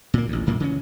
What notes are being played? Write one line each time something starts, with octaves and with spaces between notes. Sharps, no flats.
A#2 A#3
A1 D2
C2 F#2 A#2 A#3
C#3 E3 C#4